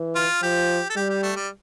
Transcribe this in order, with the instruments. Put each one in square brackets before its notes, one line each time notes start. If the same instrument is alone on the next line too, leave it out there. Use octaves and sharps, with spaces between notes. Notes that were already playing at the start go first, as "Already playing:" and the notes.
Already playing: [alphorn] E3
[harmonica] F4
[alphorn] F3 [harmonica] G4
[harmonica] A4
[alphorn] G3 [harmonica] G4
[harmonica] G4
A3
G3